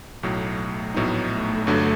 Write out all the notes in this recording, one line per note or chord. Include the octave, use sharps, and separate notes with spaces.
B1 A2 F#3 A3
A#1 A2 F#3 B3 D#4
A3
G1 G2 D3 F#3